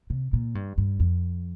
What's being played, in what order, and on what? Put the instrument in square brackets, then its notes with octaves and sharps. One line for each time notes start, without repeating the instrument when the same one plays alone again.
[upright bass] C3
A#2
G2
G2
F2